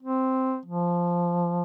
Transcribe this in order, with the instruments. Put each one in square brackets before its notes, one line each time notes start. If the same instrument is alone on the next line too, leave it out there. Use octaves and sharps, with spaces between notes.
[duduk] C4
F3